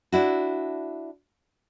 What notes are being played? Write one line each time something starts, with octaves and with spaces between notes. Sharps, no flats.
D4 E4 F#4